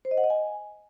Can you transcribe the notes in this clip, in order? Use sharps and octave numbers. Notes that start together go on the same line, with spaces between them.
C5
D#5
F#5
D#5
G#5